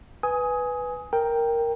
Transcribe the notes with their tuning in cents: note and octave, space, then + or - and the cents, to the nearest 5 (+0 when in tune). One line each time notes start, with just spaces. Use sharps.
B4 +0 G#5 +0 D#6 +20
A#4 +0 G5 +5